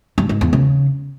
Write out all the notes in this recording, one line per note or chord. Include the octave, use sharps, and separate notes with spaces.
G2
G#2
E2
C#3